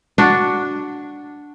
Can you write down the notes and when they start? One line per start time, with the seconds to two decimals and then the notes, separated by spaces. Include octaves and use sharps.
0.18 D4 F#4